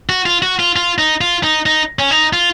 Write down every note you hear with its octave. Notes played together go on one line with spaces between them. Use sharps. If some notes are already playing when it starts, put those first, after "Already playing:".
F#4
F4
F#4
F4
F4
D#4
F4
D#4
D#4
C#4
D#4
F4